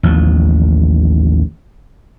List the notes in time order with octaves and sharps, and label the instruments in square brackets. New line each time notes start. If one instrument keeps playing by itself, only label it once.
[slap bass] A1 D#2 F3